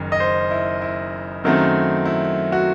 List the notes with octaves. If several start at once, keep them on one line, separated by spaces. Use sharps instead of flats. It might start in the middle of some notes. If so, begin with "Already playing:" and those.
Already playing: F#1 F#2 D#3
D#5
C5
E4
E4
F#2 D#3 F#3 A3 C4
E4
F#4